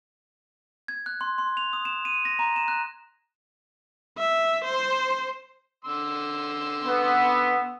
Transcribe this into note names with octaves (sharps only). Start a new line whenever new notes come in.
G#6
F#6
C6
C6
F7
D#6
E7
D#7
A#6
A#5
E7
F#6
E5
C5
D3 C6 E6
B3